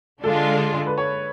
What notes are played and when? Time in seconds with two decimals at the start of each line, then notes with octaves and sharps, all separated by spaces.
0.23 D3 G#3 D4 F4 A4
0.86 B4
0.98 C#5